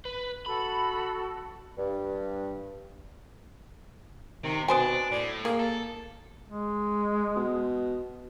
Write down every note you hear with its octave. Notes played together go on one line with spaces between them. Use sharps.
B4
F#4 A4 B5
G2
C3 D#3
B2 B3 D4 C5 G#5
A2 D5
A#3 G#4
A4
G#3
B2